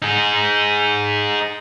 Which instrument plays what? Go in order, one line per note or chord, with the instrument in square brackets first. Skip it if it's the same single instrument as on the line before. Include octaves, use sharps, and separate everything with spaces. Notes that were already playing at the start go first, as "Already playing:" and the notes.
[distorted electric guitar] D#4 G#4